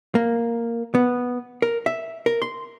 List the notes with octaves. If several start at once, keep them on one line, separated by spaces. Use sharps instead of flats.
A#3
B3
A#4
E5
A#4
C6